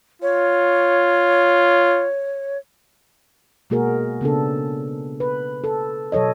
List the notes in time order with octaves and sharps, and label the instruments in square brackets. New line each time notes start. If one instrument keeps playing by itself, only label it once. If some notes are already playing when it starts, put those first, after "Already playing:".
[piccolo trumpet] F4 [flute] C#5
[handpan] B2 G#3 A#3 F#4 G#4 A#4
C#3 B3 D4 A4
B4
A4
B2 F#3 A4 C#5 D#5